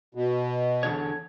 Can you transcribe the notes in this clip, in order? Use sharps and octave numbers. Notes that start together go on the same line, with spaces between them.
B2
E2 D3 C#5